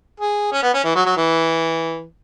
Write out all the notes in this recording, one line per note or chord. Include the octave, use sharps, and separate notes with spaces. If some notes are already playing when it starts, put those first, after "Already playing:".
G#4
C#4
B3
C#4
E3
F#3
F#3
E3